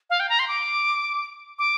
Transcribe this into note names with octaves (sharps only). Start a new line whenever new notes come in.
F5
G5
A#5
C6
D6
D6